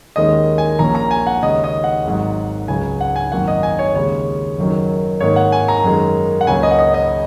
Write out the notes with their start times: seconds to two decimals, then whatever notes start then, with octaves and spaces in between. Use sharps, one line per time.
0.16 D#2 D#3 G#3 C#4 D#5
0.58 G#5
0.79 A#1 A#2 A#3 C#4 A#5
0.95 A#5
1.11 G#5
1.27 F#5
1.42 D#2 C#3 G#3 C#4 D#5
1.64 D#5
1.84 F#5
2.05 G#1 G#2 F#3
2.68 C#2 C#3 F#3 G#5
3.01 F#5
3.16 G#5
3.32 G#1 F#2 F#3 A#3 F#5
3.48 D#5
3.63 G#5
3.79 C#5
3.94 D#2 C#3 G#3 C#4 C#5
4.59 F#1 F#2 D#3 F#3
5.20 G#2 D#3 A#3 C#5
5.36 F#5
5.52 G#5
5.68 A#5
5.84 F#2 D#3 G#3 C#4
6.41 F#5
6.47 C#2 C#3 F#3 A#3 C#4 G#5
6.63 D#5
6.71 F#5
6.79 D#5
6.94 D#5